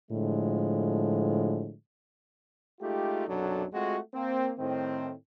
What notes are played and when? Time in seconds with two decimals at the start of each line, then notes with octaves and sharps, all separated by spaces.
0.11 A2 D3 F3 G#3
2.81 G#3 A3 D#4 F4 G4
3.28 B1 F#2 C3 F#3 D4 A4
3.73 G#3 A3 C4 F4 F#4
4.13 A#3 C4
4.58 A2 D#3 C4